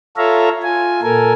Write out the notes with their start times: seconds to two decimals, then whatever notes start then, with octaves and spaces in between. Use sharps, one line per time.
0.17 F4 A4 C#5 E5 F5 A#5
0.63 F4 G#5
1.02 A#2 A4 A#4 G#5